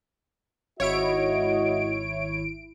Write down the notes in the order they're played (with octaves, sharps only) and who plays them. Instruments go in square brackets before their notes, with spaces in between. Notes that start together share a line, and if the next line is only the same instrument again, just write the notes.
[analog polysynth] G#1 E4 D7 [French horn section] F#4 [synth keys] C#5 [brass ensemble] D#5